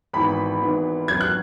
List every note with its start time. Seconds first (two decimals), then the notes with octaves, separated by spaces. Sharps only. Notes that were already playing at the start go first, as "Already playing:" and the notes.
0.14 G#1 G#2 E3 B3 B5
0.61 G#1 G#2 E3 B3
1.08 G#1 F#2 F#3 B3 E4 G#6
1.21 F#6